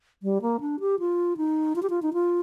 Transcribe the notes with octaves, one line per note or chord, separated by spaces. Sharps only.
G3
A#3
D4
G4
F4
D#4
F4
G4
F4
D#4
F4